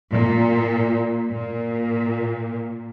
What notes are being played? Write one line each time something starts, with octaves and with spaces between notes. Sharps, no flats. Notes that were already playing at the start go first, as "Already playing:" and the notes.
A#2
A#2